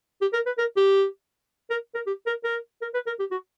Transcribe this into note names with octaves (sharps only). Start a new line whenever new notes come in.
G4
A#4
B4
A#4
G4
A#4
A#4
G4
A#4
A#4
A#4
B4
A#4
G4
F#4